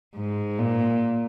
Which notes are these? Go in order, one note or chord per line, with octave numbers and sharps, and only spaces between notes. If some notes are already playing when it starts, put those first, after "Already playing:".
G#2
A#2